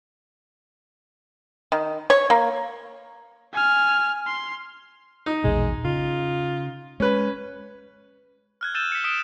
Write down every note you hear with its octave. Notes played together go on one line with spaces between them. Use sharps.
D#3
C#5
A#3
G#5 F6
C6
D#4
A#1 E2 B2 G#3
C#3 F4
G#3 C#4 B4
F6 F#6 G#6
E6 G6 A6 D#7 E7 G7
B6 C#7
D#6 B6 D7 E7 G7